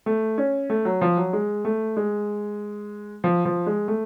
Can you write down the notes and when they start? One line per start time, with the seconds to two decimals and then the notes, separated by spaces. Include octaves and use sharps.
0.06 A3
0.38 C#4
0.70 A3
0.85 F#3
1.01 F3
1.17 F#3
1.33 G#3
1.65 A3
1.97 G#3
3.24 F3
3.45 F3
3.67 G#3
3.88 A3